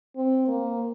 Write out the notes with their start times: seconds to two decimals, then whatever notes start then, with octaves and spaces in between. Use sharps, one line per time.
0.17 C4
0.48 A#3